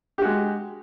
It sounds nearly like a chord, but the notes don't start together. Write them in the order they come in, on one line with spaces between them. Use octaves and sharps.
G4 F#4 G#3